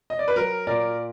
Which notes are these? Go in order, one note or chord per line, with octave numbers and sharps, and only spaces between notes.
D#5
D5
B4
F#3 A#4
A#2 A#4 D5